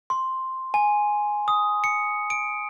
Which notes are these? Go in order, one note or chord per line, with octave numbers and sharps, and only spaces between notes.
C6
G#5
D#6
C#7
D7